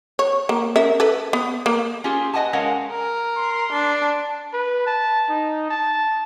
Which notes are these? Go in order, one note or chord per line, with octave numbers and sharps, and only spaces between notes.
C#5
A#3
C#4 A#4 E5
A4 B4
B3
A#3
C#4 F4 G4 G#4
B4 D#5 F#5 G#5 A5
G#3 C#4 A#4 F5 F#5
A#4
C6
D4
B4
A5
D#4
A5